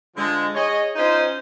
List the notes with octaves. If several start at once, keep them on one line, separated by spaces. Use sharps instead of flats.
D3 F3 G#3
G#4 C#5 D#5
C#4 D#4 F4 C5